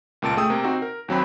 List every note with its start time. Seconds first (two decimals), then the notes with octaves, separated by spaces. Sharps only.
0.22 C#2 A#2 A5 D7
0.37 A3 G#4 G5 D#6 E6
0.50 C3 A#3
0.64 C4 D#4 F#4
0.82 A#4
1.08 D#2 F#3 C4 B5